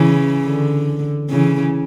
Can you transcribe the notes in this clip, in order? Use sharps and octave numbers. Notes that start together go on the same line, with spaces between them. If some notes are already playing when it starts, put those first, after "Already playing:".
Already playing: C#3 E3
D3
C#3 E3